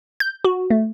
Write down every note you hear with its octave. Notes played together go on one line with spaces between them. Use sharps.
G6
F#4
A3